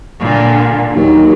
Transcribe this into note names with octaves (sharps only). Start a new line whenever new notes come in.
A#2 D3
D#2 F#3